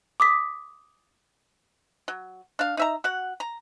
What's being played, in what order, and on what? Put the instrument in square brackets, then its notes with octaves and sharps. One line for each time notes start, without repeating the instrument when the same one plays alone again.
[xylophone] D6 D#6 B6
[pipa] F#3
D4 F5
D#4 E5 A#5
F#4 F#5
A#5